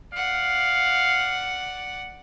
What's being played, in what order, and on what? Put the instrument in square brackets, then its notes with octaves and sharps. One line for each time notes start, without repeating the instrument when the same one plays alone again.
[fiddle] D5 F#5 [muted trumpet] F5